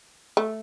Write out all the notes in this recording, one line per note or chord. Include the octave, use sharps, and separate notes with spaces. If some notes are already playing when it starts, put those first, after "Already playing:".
A3